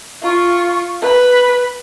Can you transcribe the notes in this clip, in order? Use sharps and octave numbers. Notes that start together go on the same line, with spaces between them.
F4 C#6
B4 B5